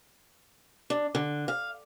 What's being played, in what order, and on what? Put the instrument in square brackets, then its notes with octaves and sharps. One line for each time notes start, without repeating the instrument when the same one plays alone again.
[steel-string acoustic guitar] D4
D3
F5